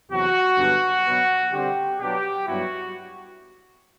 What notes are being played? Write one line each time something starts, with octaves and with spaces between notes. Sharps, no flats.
E2 C3 F#3 F#4
G2 D3 F#3 B3 D4
B2 F#3 B3
D3 G3 C4 G4
B2 F#3 B3 D4 G4
G2 F#3 B3 E4 F#4